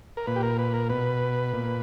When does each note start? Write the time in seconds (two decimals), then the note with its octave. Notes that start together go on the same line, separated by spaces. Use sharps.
0.17 A#4
0.27 A#2 B4
0.36 G4
0.43 A#4
0.59 B4
0.74 A#4
0.90 B2 B4
1.53 A#2